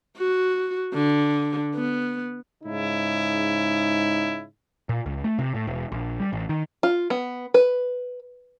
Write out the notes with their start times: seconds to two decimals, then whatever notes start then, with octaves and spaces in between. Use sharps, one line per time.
0.17 F#4
0.94 D3
1.75 B3
2.64 G#2 C#3 D#4 E4
4.89 A#2
5.06 C#2
5.24 A3
5.39 C3
5.54 A2
5.67 E1
5.92 A#1
6.20 G3
6.33 A1
6.49 D#3
6.83 F4
7.10 B3
7.54 B4